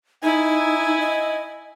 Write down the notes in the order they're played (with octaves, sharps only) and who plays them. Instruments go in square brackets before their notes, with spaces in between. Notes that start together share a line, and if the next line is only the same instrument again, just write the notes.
[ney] D#4 [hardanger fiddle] E4 G#5
[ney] D#5